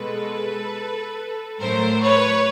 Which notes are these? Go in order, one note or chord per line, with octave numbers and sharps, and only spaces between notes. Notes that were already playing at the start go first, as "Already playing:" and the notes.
Already playing: B2 G#3 A4 B4
A2 F#3 A3 A#4 C5
B4 C#5